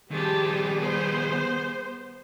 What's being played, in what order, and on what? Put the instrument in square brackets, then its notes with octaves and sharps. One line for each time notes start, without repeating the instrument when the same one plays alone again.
[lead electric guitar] D#3 F3 [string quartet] G3 G#4 [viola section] C4 G4 A5
[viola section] B3 C5